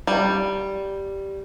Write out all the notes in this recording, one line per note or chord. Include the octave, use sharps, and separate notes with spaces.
G3